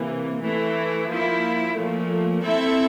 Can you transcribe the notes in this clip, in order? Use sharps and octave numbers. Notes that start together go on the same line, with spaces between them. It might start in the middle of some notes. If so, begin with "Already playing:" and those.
Already playing: C3 E3 A#3
E3 A3 E4
F3 A#3 E4
A#2 F3 A3
C4 E4 A4 E5